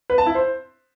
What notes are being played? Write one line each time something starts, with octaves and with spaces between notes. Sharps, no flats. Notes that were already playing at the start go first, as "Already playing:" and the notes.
B4
A5
E4
C5